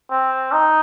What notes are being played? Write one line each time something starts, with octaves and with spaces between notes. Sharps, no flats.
C4
D#4